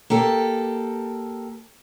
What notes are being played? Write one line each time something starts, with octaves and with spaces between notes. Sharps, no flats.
A#3 G4 A4